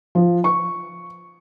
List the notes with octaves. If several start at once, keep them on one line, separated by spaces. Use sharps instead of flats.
F3
C#6